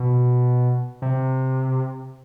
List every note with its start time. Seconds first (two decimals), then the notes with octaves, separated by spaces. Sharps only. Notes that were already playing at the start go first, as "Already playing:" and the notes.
Already playing: B2
1.02 C3